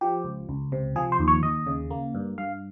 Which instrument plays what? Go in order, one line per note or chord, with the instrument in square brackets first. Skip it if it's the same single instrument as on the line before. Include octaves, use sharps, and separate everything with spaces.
[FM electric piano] F3 G4
C#2
C#2
C3
F3 G#4
C5
D#2
C#5
D#2 D#5
C#3
A#3
G2
G2 F5